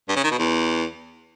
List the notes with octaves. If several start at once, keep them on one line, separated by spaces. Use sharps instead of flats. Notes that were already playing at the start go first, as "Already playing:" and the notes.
G2
C#3
D#3
B2
E2